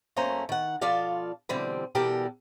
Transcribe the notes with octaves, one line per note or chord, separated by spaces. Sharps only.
F#2 A3 A#3 C#4 C5 A#5
D#3 F#5
B2 F3 F4 A4 D5 F5
B2 D3 E3 G3 C4
B2 E3 G3 G4 A4 A#4